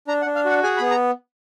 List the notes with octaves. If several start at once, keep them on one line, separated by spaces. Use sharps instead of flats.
D4 A#5
F#5
D4
F5
F#4 F#5
G#4 G#5
B5
B3
A#5